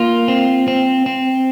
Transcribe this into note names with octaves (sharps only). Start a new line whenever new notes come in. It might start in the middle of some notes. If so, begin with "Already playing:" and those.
Already playing: A#3 F4
C4
C4
C4